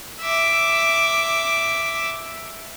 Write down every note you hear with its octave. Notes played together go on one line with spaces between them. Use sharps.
E5 D6